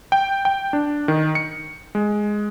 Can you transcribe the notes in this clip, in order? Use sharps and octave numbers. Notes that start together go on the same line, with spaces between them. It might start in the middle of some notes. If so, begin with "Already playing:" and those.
G5
G5
D4
D#3
C#7
G#3